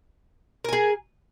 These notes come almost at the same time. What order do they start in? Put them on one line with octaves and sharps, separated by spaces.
A#4 G#5 G#4